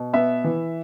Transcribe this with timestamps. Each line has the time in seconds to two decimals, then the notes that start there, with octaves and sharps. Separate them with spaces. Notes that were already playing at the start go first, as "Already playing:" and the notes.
Already playing: B2
0.13 B3 E5
0.44 E3